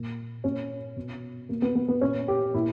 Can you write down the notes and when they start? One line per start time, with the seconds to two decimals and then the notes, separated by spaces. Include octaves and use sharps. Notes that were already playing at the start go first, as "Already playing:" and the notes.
Already playing: A#2
0.44 A#2 C#4
0.96 B2
1.49 B2 A#3
1.62 B3
1.75 B3
1.88 B3
2.01 A#2 C#4
2.28 G4
2.54 A#2 E4